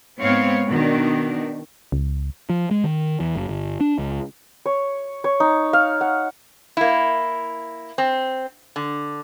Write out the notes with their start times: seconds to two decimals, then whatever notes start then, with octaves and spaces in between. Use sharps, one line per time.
0.20 G#2 B3 C4 C#5 F5
0.68 B2 D#3 D4
1.92 C#2
2.50 F3
2.71 G#3
2.84 D#3
3.20 E2
3.35 F#1
3.49 G1
3.81 D4
3.98 C#2
4.66 C#5
5.24 C#5
5.40 D#4
5.73 F5
6.01 F#5
6.77 A#3 E4
7.98 C4
8.76 D3